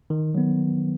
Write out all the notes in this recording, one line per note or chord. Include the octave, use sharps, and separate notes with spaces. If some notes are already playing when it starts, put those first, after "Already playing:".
D#3
F#3 B3